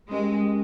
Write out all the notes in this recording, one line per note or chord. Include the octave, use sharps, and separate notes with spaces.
G#3 C#4 G4 A#4